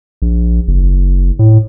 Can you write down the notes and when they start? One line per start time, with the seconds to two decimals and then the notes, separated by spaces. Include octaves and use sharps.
0.22 A#1
0.68 F#1
1.39 A2